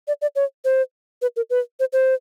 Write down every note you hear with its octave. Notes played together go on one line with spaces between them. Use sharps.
D5
D5
C#5
C5
B4
A#4
B4
C5
C5